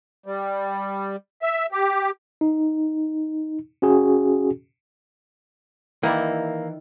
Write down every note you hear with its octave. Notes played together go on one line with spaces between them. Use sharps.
G3
E5
G4
D#4
C#4 F#4 G#4
D#3 E3 A#3 E4 D5